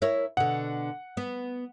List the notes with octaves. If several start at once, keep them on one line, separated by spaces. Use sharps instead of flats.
E4 A#4 C#5
B2 D3 F#5
B3